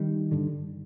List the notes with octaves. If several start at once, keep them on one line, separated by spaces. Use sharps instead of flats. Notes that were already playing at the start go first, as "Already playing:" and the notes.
Already playing: D#3 G3
G2 D3